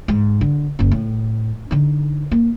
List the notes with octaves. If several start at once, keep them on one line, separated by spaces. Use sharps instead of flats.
G#2
D3
F#1 C#4
A2
D3 D#4
A#3